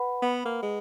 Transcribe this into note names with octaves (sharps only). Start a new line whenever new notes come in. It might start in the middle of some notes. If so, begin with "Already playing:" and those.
Already playing: B4 F#5 B5
B3
A#3
G#3